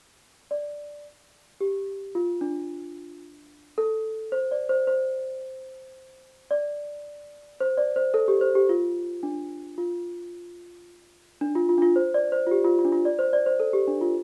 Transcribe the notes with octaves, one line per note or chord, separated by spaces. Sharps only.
D5
G4
F4
D4
A4
C5
D5
C5
C5
D5
C5
D5
C5
A4
G4
C5
G4
F4
D4
F4
D4
F4
F4
D4
F4
C5
D5
C5
F4
G4
F4
F4
D4
F4
D5
C5
D5
C5
A4
G4
D4
F4